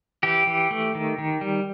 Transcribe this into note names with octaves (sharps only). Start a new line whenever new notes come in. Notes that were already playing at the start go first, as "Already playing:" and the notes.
E3 G4
E3
A3
D#3
D#3
G3